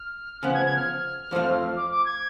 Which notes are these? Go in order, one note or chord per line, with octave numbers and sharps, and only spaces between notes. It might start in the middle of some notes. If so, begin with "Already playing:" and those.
Already playing: F6
C#3 F3 B3 F#6
G#6
G#6
F6
F2 F3 A3 F4
D6
D6
G#6